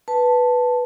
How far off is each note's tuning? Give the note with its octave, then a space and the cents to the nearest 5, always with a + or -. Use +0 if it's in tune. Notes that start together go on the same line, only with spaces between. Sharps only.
B4 +0 A5 +0